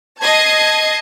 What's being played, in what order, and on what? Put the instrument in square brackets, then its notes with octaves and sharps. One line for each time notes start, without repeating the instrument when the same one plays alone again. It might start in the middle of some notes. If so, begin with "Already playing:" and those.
[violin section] D#5 A5 G#6 C7